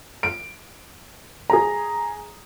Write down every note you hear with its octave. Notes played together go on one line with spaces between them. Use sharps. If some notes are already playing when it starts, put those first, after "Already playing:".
D7
G#4 A#5